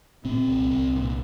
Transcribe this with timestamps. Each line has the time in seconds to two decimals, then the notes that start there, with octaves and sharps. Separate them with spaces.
0.25 A#2 C4
0.48 C2
0.70 C2
0.93 A#2